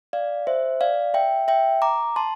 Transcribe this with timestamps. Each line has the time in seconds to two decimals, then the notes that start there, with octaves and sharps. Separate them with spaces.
0.13 D5 F5
0.47 C5 E5
0.81 D5 F5
1.14 E5 G5
1.48 E5 G5
1.82 A#5 D6
2.16 A5 C6